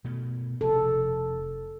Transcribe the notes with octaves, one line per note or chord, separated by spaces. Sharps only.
B2 A3
F1 A4